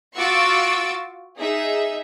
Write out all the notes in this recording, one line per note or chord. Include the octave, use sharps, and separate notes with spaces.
F4 F#4 C#6 D6 E6 A6
D#4 G#4 E5